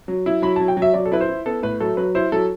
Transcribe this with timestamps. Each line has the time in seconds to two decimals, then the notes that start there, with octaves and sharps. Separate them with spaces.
0.08 F#3
0.26 E4
0.42 F#3 B5
0.56 F#3 A5
0.68 G5
0.77 F#3
0.82 E5
0.94 F#3 D5
1.06 A4
1.12 E4 B4
1.21 C5
1.29 E4
1.46 B3 A4
1.63 A2 B4
1.80 F#3 A4
1.97 F#3 B4
2.15 E4 C5
2.32 F#3 A4